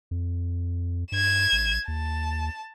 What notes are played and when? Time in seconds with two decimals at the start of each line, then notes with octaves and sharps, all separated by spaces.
0.11 F2
1.12 G2 G#6 E7
1.52 A1
1.88 D#2 A5